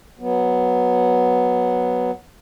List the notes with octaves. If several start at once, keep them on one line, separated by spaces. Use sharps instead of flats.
F#3 B3